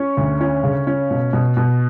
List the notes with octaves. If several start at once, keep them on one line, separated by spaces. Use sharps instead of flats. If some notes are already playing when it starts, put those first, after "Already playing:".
Already playing: C#4 C#6
D2
C#4
C#3
C#4
B2
B2
B2